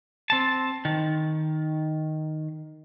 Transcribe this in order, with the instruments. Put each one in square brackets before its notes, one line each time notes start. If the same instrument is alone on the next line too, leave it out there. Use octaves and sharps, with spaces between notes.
[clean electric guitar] C4 A5
D#3